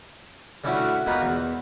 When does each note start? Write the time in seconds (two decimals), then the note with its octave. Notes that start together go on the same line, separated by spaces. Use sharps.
0.64 G3 A3 C#4 D4 E4 F#4
1.06 A#3 B3 D#4 F4 F#4 B4
1.22 E2